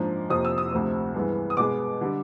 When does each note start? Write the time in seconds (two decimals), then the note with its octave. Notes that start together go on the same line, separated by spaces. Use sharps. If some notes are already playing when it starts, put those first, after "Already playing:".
Already playing: G#2 F3 A#3 D4
0.29 F2 C3 F3 A#3 D#6
0.45 E6
0.58 D#6
0.72 D2 C3 F3 A3 C4
1.14 G2 E3 G#3 B3
1.50 D#6
1.57 B2 G#3 B3 D6
2.01 D3 G3